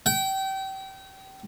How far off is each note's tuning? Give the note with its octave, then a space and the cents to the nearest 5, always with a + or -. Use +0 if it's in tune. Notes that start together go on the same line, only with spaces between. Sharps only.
G5 -30